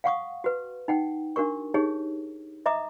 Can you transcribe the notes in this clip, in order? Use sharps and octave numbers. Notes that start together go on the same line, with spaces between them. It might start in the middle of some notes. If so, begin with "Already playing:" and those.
F5 F#5 C#6 D#6
F#4 B4
D#4 F#5 G5
D4 F#4 A#4 C#6
D#4 G4 G#4 C#5
D#5 E5 A#5 D6 D#6